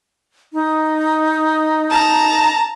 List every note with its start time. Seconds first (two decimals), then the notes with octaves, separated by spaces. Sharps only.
0.53 D#4
1.91 A5 A#5